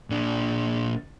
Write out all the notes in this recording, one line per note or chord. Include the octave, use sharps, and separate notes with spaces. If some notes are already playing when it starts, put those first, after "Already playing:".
A#2 D4